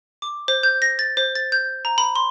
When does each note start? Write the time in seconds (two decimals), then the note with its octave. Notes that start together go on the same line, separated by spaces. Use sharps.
0.22 D6
0.48 C5
0.63 G6
0.82 A#6
0.99 A6
1.17 C5
1.35 A6
1.52 G6
1.85 A#5
1.98 B5
2.16 C6